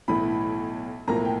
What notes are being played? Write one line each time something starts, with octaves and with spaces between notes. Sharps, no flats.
B1 A2 E3 B5
B1 A2 F3 A#3 A#5
G5